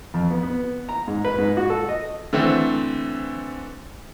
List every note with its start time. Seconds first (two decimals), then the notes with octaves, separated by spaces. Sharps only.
0.14 F2
0.31 B3
0.43 B3
0.89 A#5
1.08 G#2
1.25 B4
1.38 G#2
1.57 F#4
1.70 A4
1.89 D#5
2.33 D3 E3 A3 C4